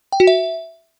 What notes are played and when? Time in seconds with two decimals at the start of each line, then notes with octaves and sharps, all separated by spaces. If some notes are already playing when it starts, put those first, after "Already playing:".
0.12 G5
0.20 F#4
0.27 E5